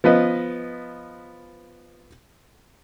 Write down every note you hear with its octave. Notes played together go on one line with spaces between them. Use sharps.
F3 B3 B4 D#5